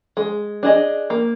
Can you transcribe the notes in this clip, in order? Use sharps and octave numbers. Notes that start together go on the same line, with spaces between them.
G#3
D4 G#4 D#5
A#3